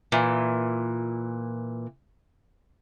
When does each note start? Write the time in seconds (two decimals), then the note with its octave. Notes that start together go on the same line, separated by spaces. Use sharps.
0.12 A#2 E3